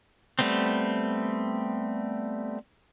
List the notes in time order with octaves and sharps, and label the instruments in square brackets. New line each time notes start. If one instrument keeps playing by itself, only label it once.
[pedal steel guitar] G3 A3 B3 C4